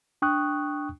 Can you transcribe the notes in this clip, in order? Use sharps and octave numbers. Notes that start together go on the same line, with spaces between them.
D4 G5 C#6 D#6 F#6